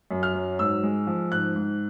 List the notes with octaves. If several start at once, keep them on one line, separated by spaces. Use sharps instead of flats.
F#2
F6
F#3
G#2 E6
G#3
F3
G#2 F#6
G#2